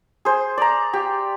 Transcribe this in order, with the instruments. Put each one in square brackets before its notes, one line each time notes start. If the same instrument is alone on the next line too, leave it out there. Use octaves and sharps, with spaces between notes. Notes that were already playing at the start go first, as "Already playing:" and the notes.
[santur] G#4 C5
D5 A#5
G4